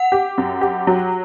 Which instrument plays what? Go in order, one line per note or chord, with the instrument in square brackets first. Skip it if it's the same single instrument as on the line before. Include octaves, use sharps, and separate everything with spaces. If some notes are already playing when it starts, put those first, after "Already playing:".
Already playing: [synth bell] F#5
[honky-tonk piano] G4
F#2
G4
F#3